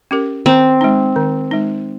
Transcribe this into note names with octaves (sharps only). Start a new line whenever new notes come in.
C#4 G4 A#4
D#3 C4
G#3 D#4
D#3
G#3 D#4